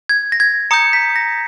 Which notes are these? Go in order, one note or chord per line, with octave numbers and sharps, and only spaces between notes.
G#6
A#6
G#6
A#5 D#6 G6 C#7
B6
A#6